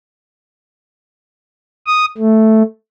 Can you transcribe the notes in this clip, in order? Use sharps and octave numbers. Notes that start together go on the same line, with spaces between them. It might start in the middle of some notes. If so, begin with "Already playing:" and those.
D#6
A3